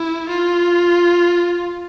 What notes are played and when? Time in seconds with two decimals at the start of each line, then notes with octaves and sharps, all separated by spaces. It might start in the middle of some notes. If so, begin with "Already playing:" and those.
Already playing: E4
0.29 F4